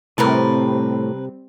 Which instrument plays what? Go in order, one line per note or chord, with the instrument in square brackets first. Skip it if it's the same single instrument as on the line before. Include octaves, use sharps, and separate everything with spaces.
[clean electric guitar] A2 [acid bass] C3 [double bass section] G3 C4 [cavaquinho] A#4 B4 A5